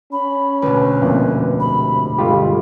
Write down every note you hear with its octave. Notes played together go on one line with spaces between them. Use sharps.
C#4 B5
D2 B2 B4
F2 A#2 E4
C3 B5
G1 G#3 F4 G4